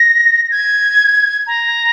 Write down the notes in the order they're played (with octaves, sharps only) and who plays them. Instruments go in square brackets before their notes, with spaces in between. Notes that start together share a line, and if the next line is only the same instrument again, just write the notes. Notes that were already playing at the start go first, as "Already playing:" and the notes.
Already playing: [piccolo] A#6
G#6
A#5